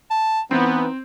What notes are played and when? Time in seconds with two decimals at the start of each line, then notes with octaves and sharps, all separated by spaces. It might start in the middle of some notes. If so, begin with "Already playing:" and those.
0.11 A5
0.51 E3 B3 C4 D#4